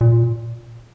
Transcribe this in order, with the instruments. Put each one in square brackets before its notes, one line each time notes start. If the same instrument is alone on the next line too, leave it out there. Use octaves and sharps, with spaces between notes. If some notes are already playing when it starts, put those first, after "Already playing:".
[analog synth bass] A#2